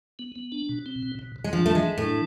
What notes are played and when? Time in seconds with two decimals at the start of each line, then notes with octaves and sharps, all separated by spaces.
0.19 B3
0.36 B3
0.52 D4
0.69 B2
0.86 C4
1.03 B2
1.19 B2
1.36 B2
1.44 G#3
1.53 F3 D4
1.66 A3
1.70 E3
1.75 G#3
1.87 E3
1.98 A2
2.03 D4